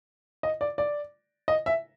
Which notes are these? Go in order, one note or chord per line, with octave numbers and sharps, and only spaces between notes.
D#5
D5
D5
D#5
E5